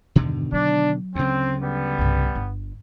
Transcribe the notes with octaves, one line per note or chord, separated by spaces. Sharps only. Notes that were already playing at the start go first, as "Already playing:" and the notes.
E2 G2 B2 D3 D#3
F#3 D4
D2 C#3 C4
G3 B3
C2 G2
G1